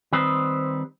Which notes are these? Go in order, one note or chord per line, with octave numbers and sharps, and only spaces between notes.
D#3 G3 C4 B4 C5 D#5